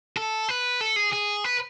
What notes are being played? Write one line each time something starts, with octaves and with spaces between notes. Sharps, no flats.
A4
B4
A4
G#4
G#4
B4